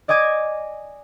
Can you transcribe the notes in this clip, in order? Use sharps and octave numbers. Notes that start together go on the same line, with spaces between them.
D5 D#5 G#5 D6 G#6